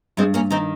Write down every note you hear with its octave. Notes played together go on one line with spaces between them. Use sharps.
G2 G#3 C4
A#3 C#4
D#3 C4 D#4